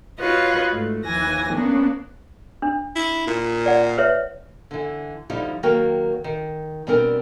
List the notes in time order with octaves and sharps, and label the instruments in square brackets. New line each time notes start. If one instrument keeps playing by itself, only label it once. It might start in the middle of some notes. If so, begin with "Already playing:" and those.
[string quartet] F4 F#4 B4 C#5 D#5
G#2 A3
D#2 E3 F3 G#5 A#6
A#3 B3 C#4 D4
[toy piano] D4
[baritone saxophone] E4
A#2
[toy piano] D5 F#5
B4 C#5 E5
[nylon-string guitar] D3 E3
D3 F3 G3 D#4 E4
D#3 F#3 A#3 F#4 A#4 G5
D#3
B2 G3 C4 D4 A#4 G5